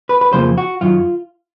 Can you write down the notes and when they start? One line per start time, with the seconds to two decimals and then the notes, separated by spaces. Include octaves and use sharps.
0.09 B4
0.21 B4
0.33 F2 C#3 F3 A#3 C5
0.58 F#4
0.81 F#2 D#3 F#3 F4